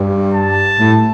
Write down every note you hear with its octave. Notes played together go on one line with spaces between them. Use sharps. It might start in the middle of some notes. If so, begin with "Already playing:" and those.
Already playing: G2
A5
A2